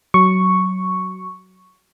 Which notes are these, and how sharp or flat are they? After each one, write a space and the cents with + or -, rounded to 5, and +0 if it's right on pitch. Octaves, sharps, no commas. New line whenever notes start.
F#3 +15 C#6 +0